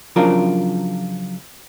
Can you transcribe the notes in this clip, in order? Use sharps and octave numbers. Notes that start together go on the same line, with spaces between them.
C#3 F3 F#3 D4 F4 A#4